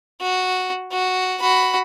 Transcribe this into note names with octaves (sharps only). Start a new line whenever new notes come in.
F#4
F#4
F#4 B5